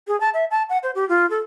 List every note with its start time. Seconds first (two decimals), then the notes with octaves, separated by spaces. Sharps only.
0.08 G#4
0.20 A5
0.34 E5
0.51 A5
0.69 F#5
0.83 C5
0.95 G4
1.09 F4
1.30 A4